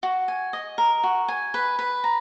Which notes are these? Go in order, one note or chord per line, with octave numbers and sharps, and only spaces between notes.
F#4
G#5
D#5
A#4
F#4
G#5
B4
B4
A#5